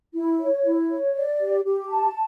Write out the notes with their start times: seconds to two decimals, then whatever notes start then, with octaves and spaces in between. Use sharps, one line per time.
0.14 E4
0.39 C#5
0.64 E4
0.89 C#5
1.14 D5
1.40 G4
1.64 G4
1.89 A5